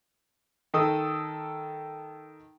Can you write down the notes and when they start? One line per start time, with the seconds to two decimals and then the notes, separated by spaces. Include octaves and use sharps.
0.74 D#3 A4 D#6